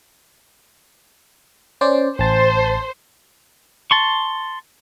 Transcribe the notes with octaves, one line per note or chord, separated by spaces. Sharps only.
C#4 C5 D5
A1 C5 A5
A5 C6 C#6